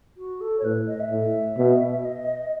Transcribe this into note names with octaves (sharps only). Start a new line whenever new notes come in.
F#4
A4
C#5
A2 B4
D#5
E5
A2
B2
D#5